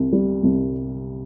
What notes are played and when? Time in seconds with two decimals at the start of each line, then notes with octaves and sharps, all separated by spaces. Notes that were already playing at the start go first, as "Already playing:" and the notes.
Already playing: C2 C3
0.13 G3
0.43 C2